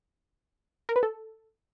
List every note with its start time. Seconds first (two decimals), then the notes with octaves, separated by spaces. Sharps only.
0.89 A#4
0.96 B4
1.03 A4